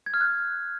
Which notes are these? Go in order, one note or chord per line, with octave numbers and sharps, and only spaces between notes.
G#6
F6
F#6